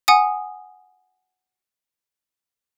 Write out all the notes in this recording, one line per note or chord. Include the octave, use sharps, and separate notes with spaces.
F#5 G#5 D#6